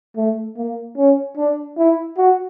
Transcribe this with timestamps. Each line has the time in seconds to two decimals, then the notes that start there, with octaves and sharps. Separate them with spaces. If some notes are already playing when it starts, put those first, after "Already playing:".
0.17 A3
0.57 A#3
0.97 C#4
1.37 D4
1.77 E4
2.17 F#4